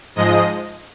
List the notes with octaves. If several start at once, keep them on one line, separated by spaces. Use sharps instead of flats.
G#2 F3 G#3 D#5